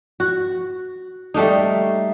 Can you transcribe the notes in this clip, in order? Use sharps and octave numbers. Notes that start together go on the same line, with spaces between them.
F#4
G3 A3 A#3 D#4